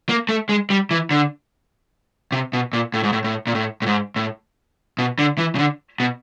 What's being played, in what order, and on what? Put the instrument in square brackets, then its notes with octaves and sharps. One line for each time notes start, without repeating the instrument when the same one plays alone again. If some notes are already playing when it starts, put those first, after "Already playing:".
[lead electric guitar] A#3
A3
G#3
G3
E3
D3
C3
B2
A#2
A2
G#2
A2
A2
A#2
A2
A2
G#2
A2
B2
D3
E3
C#3
D3
B2